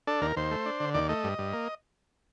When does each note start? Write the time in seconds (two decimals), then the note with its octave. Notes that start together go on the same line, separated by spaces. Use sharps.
0.07 D4 A4
0.21 D#2 A#4
0.36 D#2 C5
0.51 A3
0.66 D4
0.80 D3
0.94 D#2 D5
1.09 A3 D#5
1.24 G2
1.38 G2
1.53 A#3